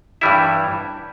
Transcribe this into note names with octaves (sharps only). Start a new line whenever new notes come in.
G2 E3 G3 E4 E5